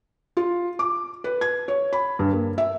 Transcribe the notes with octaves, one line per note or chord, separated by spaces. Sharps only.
F4
D6
B4
G#6
C#5
B5
G2
A#3
E5